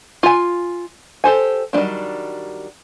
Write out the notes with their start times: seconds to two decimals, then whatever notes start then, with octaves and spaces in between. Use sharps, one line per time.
0.23 F4 G#5
1.24 G4 A4 C5 G#5
1.73 D#3 F#3 G3 A3 D4